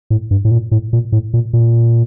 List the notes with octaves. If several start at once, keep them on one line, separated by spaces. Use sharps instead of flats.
A2
G2
A2
A#2
A2
A#2
A2
A#2
A#2